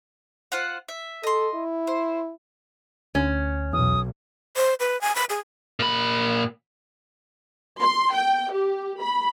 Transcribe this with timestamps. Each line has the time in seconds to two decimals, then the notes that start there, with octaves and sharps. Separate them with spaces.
0.52 F4 C5 F#5
0.88 E5
1.23 A4 D#5 C6
1.54 E4
1.87 C5
3.15 D2 C#4
3.73 B1 E2 D#6
4.56 C5
4.80 B4
5.01 G#5
5.15 B5
5.30 G#4
5.80 A#2 B5
7.80 C6
8.14 G5
8.53 G4
9.01 B5